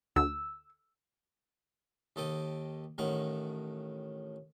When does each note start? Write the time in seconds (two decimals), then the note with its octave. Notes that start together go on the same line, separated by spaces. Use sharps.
0.16 D2 E6
2.16 D#2 A4 D#5 G5
2.98 A1 A2 D#3 F#5 A#5